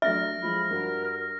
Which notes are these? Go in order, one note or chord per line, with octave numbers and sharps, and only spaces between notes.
F#3 A3 D4 E5 F6 A#6
F3 G#3 B5
G2 F#4 A#4